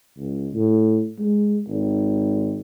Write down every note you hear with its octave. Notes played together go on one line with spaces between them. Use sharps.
C#2
A2
G#3
G#1